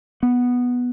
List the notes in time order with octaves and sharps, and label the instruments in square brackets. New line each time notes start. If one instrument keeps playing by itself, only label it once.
[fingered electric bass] B3